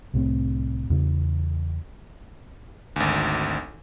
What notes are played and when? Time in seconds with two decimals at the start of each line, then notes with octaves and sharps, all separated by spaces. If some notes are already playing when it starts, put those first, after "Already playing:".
0.14 C2 A2 A3 C4
0.90 E2 C#3
2.96 G#1 D2